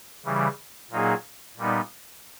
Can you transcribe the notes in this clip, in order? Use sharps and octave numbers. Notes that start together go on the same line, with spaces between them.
C#3 E3 G3
A#2 F#3 A#3 D#4 G#4
A#2 G3 B3 D#4